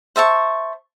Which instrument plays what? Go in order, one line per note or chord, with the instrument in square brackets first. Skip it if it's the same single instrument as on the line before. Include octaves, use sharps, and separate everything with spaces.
[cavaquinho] C5 E5 A5 C#6